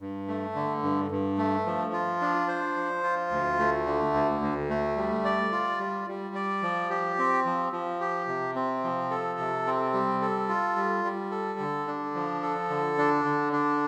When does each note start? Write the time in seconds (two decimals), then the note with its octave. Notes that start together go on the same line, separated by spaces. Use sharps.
0.01 G2
0.28 A3
0.55 D3
0.83 G2
1.11 G2
1.38 A3
1.66 F3
1.93 F4
2.21 D4
2.48 C5
2.76 F3
3.03 F4
3.31 D2
3.59 A3
3.86 D3
4.14 D2
4.41 D2
4.70 A3
4.97 G3
5.25 D5
5.52 F4
5.80 G3
6.08 G3
6.35 D5
6.62 F3
6.90 G4
7.18 C4
7.46 F3
7.72 F3
8.00 G4
8.28 C3
8.56 C4
8.84 F3
9.11 A4
9.39 C3
9.67 C4
9.94 G3
10.21 A4
10.49 F4
10.76 G3
11.04 G3
11.31 A4
11.59 D3
11.87 D4
12.15 F3
12.43 A4
12.70 D3
12.98 D4
13.25 D3
13.53 D4